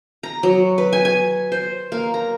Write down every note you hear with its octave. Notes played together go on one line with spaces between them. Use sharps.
A#5
F#3
B4
G#5
G#5
C5
A#3
A#5